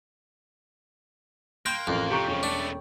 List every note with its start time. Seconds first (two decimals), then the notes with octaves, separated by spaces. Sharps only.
1.66 A#3 G5 C6 F#6 G6
1.87 A1 F2 A#4
2.11 C3 G4 G5 A#5 C#6
2.28 E1 C#3 F3 C#4
2.43 A3 B3 D4